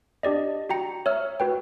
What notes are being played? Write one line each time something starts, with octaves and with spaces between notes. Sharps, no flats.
D4 G4 D5 D#5
F#4 G5 A#5 C#7
C#5 E5 E6 F6
F#4 B4 G5